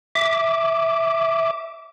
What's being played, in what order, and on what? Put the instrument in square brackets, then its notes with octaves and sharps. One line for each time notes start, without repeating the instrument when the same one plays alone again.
[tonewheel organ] E5 D6